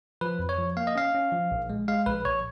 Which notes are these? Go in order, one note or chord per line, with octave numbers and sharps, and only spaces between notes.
F3 B4
F2
C#5
F3
A#3 F5
D#5
C#4 F5
C#4
F3
A#1
G#3
G#3 F5
A#1 B4
A#1 C#5